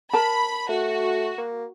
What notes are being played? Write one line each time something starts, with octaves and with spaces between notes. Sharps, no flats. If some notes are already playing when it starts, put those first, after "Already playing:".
A#4 A5 B5
A3 F#4
A#3